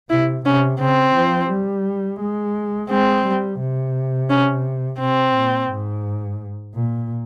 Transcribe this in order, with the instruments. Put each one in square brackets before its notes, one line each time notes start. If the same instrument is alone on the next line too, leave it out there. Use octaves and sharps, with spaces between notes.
[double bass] C3 [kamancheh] E4
[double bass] C3 [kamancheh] C#4
[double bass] C#3 [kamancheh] C4
[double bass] F3
G3
G#3
[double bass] G#3 [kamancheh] C4
[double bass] G3
C3
[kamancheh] C#4
[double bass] C3 [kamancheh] C4
[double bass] A#2
G#2
A#2